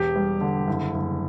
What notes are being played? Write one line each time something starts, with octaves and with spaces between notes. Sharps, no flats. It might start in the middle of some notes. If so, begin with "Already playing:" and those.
Already playing: E1 G4
G3
D3
F#1
F#1